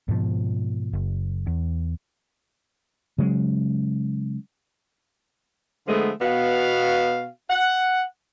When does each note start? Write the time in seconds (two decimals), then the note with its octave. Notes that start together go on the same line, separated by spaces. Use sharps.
0.08 G#2 B2 F3
0.93 F#1
1.47 E2
3.18 C#3 F#3 G#3
5.88 D3 F3 G#3 A3 B3
6.21 B2 B3 F#4 F5
7.50 F#5